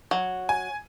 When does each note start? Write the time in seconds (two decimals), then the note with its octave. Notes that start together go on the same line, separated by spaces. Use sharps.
0.11 F#3
0.49 G#5